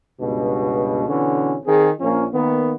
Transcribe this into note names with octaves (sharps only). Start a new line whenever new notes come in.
C#2 G2 B2
B2 D3 E3 C#4
D#3 C4 G#4
A#1 F3 A#3 C#4
D#3 A#3 B3